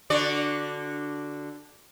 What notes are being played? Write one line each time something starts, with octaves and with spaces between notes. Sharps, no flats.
D3 F#4 D5